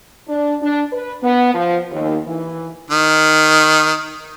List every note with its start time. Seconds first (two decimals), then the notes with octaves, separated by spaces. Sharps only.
0.29 D4
0.62 D4
0.93 B4
1.22 B3
1.54 F3
1.91 D#2
2.27 E3
2.90 D#3